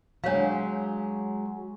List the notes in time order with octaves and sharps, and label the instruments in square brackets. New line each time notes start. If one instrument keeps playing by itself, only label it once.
[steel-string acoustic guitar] F#3 G#3 [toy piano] D4 C#5 F5